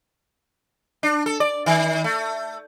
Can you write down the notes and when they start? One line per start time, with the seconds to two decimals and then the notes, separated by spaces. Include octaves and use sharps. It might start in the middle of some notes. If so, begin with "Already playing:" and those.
1.03 D4
1.26 A4
1.40 D5
1.66 D#3
2.04 A3